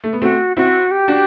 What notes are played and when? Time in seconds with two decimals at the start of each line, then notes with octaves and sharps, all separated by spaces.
0.04 A3
0.13 B3
0.22 A3 C4 F#4
0.57 C4 E4 F#4
0.91 G4
1.08 D4 F#4